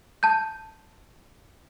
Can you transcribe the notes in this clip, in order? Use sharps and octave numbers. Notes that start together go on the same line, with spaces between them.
A5 G6